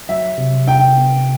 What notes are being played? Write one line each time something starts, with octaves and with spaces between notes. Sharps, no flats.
F#3 E5
C3
D4 G5
B3